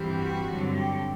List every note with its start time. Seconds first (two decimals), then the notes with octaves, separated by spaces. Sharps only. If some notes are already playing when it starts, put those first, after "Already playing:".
Already playing: G2 E3 G3 C4
0.15 F#4
0.44 G2 D3 F#3 C4
0.75 G4